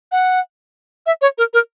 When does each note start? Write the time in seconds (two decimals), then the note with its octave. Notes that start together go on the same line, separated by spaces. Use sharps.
0.12 F#5
1.06 E5
1.22 C#5
1.38 A#4
1.54 A#4